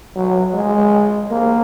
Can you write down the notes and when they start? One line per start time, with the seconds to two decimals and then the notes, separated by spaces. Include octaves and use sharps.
0.15 F#3
0.54 G#3
1.31 A#3